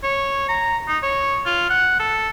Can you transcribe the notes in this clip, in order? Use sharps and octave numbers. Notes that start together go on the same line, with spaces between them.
C#5
A#5
D#4
C#5
F4
F#5
A4